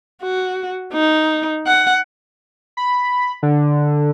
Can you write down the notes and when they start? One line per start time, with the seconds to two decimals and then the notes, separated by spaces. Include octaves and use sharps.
0.22 F#4
0.93 D#4
1.67 F#5
2.77 B5
3.43 D3